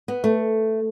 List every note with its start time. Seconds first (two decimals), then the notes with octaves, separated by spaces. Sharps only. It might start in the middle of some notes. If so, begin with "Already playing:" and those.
0.08 B3
0.24 A3